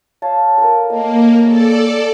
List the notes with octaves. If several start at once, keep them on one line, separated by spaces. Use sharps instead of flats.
C#5 F5 A5
A4 A#4
A#3 D#5
A3 G#4 A4 D5 G#5